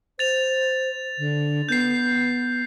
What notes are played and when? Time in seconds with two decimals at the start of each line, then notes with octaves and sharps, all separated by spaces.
0.19 C5 A6 F7
1.18 D3
1.69 B3 G6 C7